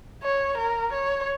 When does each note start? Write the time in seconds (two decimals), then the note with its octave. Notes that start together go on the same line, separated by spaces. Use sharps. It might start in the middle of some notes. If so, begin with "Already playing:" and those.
0.23 C#5
0.58 A#4
0.93 C#5